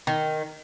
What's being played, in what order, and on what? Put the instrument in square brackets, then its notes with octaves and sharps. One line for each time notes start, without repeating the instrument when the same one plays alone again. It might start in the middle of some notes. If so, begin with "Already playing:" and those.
[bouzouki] D#3